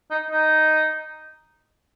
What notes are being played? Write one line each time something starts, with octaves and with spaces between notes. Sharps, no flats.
D#4
D#4